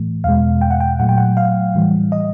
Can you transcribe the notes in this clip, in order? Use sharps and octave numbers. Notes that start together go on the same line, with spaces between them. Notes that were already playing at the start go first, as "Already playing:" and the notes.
Already playing: A2 E3 A3
E2 B2 G#3 F5
G5
F#5
G5
A#2 F#3 A3 F#5
G5
F#5
F5
A2 E3 G3
D#5